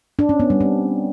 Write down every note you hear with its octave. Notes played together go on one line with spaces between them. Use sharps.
D4
C#4
B3
G3
C4